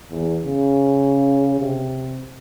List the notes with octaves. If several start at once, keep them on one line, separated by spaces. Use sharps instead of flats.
E2
C#3
C3